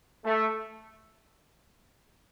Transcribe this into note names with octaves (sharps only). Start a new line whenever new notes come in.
A3